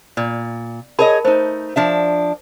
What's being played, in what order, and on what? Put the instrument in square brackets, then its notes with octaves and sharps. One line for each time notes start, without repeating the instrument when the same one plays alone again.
[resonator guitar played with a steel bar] A#2 [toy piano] D5
[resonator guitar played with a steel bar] G#4 C#5 D#5 [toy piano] A#4 A5 B5
[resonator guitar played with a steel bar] A3 D#4 [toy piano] C5
[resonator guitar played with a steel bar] F3 D4 E5